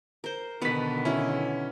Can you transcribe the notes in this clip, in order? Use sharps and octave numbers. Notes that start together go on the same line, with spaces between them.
A#4 C5
B2 D3 D#3 B3 B4 F#5 A5 B6
F#3 C#4 E4